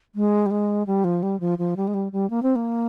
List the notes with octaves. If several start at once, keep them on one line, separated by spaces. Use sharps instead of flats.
G#3
G3
G#3
G3
F3
G3
F3
F3
G3
G#3
G3
G3
A#3
C4
A#3